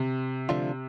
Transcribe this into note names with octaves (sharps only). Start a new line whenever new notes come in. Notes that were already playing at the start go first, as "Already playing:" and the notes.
Already playing: C3
D3 F3 A3 D4 F4